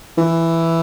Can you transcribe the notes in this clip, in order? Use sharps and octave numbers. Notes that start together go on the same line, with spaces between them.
E3